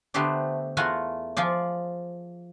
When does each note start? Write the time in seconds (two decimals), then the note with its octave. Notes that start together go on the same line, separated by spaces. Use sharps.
0.14 D3 A3 B3 G4 C5 D5
0.77 E2 A3 F4 F#5 G#5 A#5
1.37 F3 F4 G#4 D5